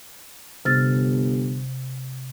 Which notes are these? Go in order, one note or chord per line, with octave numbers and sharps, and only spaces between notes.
G1 C3 F6 A6